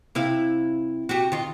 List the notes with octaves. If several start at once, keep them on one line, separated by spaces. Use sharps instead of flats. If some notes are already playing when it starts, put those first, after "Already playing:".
C3 E4 F5
F#4 G4
D#3 F4